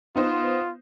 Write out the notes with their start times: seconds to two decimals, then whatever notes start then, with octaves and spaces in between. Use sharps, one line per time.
0.16 B3 D#4 F4 C5